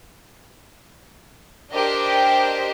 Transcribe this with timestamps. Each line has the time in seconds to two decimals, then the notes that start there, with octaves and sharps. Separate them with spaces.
1.72 D4 G4 A#4 C5 D#5